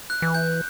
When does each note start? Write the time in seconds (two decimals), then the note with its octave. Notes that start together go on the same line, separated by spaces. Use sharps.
0.10 F#6
0.22 E3
0.34 G6